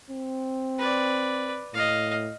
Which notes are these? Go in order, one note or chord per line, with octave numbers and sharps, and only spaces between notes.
C4
B4 D5
A2 D#5 F5